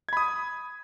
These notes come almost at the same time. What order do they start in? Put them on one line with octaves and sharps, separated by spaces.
G#6 B5 D#6